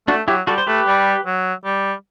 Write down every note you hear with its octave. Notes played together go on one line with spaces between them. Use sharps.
A3 D4 F#4
F#3 E4 G4
G3 F#4 A4
C5
A3 G4 B4
G3
F#3
G3